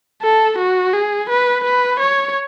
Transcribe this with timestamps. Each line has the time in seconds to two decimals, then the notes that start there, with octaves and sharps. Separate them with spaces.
0.22 A4
0.59 F#4
0.93 G#4
1.29 B4
1.64 B4
2.00 C#5